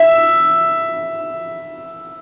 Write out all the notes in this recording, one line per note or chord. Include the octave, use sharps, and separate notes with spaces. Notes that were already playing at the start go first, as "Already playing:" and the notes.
Already playing: E5